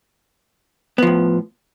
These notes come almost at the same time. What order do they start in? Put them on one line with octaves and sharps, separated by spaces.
B3 F3 A2